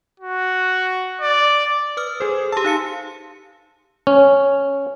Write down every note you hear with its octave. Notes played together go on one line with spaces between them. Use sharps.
F#4
D5
B4 D#6 F6
G#4 A4 C5
G4 A5 E6
D#4 F5 C#7
C#4